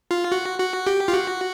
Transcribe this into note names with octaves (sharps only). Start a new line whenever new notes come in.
F4
F#4
F#4
G4
F4
F#4